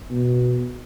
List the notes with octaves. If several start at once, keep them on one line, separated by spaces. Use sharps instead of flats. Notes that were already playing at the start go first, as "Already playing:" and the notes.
B2